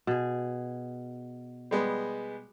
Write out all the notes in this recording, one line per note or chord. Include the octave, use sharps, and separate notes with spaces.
B2 G#4
G3 G#3 B3